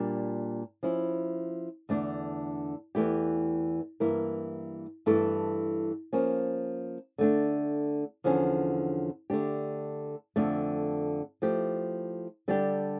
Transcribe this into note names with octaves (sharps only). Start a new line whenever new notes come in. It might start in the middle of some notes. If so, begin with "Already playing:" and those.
Already playing: A#2 G3 D4
F3 C#4 E4
E2 D3 A3 D4
E2 E3 A3 E4 G4
G2 E3 A#3 E4 A#4
G2 E3 A3 E4 A4
F3 A#3 C#4
D3 A3 D4
E2 D3 F3 C#4
D3 A3 D4 G4
F2 D3 A3
F3 A3 E4 G4
D3 G3 D4 G4